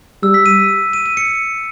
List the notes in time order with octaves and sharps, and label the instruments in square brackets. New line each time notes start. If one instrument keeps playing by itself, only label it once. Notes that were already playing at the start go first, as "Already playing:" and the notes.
[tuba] G3 [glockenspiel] E6
[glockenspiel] B6
D#7
D#7
D#7
C#7